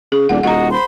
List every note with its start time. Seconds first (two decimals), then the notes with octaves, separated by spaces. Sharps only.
0.12 C#3 G#4
0.29 D#1 D4 F#5
0.43 D#1 F#4 D#5 F#5 A#5
0.72 C5 B5 C6